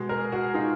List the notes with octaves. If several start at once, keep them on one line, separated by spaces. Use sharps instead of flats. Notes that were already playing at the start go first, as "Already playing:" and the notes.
Already playing: B2 G#3
G#4 A#4
F#4 G#4
D#4 F4